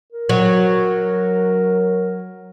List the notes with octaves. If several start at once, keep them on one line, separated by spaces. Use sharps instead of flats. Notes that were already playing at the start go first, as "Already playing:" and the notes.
A#4
F#3